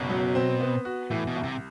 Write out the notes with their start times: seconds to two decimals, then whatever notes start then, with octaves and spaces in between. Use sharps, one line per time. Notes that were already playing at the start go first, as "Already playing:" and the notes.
Already playing: F#1 B2
0.10 F#3
0.35 C4
0.60 B3
0.85 F#4
1.11 A2 E3
1.27 B2
1.36 C2
1.43 C3